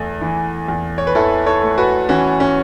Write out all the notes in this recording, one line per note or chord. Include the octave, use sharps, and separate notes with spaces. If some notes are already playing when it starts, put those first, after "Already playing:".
Already playing: E2 A3
E3
E2
C#5
B4
E2 E4 A4
A4 C#5
A3
F#4 B4
E3 C#4 F#4
C#4